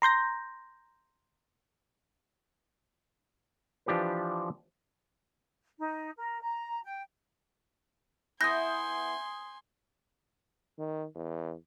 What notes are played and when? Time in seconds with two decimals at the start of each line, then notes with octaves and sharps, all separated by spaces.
0.02 A#5 C6 G6 A#6
3.86 E3 F3 D4 G4 B4 C5
5.78 D#4
6.18 A#4
6.42 A#5
6.84 G5
8.41 B3 E4 G#5 C6 D#6 G6 A#6
10.78 D#3
11.15 E2